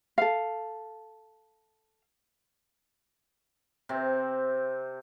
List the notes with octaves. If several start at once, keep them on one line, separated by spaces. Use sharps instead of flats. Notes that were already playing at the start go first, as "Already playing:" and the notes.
A4 F5
C3 C4